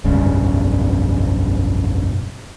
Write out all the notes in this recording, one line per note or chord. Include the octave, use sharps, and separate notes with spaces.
F1 B1 G2 C#3